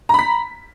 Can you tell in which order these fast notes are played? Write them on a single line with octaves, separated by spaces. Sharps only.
A#5 B5 B6